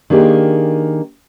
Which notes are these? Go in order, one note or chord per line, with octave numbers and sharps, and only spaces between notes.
D#3 A#3 D4 G4 G#4